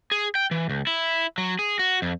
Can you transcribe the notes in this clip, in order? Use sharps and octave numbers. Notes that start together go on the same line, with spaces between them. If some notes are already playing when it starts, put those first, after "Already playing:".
G#4
G5
E3
C#2
E4
F#3
G#4
F#4
F2